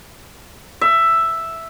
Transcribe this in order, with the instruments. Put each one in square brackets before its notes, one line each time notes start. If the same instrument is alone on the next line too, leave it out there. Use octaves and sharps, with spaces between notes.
[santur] E5